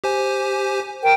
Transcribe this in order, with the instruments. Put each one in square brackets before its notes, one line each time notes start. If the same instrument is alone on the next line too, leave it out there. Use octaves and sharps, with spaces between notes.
[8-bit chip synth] G4 C5 G#5
[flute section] A#4 G5